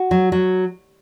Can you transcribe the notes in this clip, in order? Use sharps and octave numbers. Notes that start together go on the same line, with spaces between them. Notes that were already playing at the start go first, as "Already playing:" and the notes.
Already playing: F#4
F#3
F#3